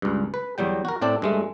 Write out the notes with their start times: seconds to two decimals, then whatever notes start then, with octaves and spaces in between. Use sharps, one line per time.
0.02 C#2 G2
0.34 B4
0.58 E2 F#3 G3 G5
0.85 F#4 A#4
1.02 A2 C4 D4 D5
1.22 G2 G#3 A3